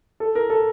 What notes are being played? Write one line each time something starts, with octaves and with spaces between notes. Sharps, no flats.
A4
A#4
A4